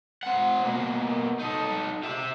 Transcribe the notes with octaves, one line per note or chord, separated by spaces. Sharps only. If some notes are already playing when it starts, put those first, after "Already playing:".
C4 F#5
B2 A#3
D#4 A4
G4 E5